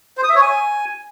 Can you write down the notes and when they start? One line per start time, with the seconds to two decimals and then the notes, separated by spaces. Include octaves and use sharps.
0.17 C5
0.23 D#6
0.29 E5
0.35 C#5
0.41 G#5